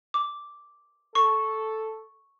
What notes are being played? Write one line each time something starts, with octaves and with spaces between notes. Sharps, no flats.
D6
A4 C#6